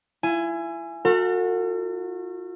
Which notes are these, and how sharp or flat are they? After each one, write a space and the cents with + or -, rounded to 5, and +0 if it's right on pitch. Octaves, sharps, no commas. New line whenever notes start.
E4 +35 G#5 +0
F#4 -30 A4 +45